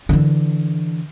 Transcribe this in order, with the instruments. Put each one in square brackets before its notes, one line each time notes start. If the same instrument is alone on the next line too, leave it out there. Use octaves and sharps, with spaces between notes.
[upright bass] D3 E3